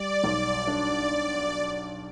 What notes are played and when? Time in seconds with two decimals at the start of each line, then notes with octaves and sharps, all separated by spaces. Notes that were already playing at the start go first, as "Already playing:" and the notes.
Already playing: G3 D5
0.24 B1
0.67 D4 D5